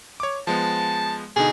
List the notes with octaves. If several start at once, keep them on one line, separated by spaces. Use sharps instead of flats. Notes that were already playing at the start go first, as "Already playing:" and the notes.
C#5 D6
F3 G#3 B3 A5
B2 D3 D#4 G#4